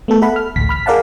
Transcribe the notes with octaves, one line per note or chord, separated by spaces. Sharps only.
A3 B3 A4
A4 E5 F#5 B5
F6
A1 D2 B6
B5 F6 B6
G#4 A#4 D5 F5 F#5 A5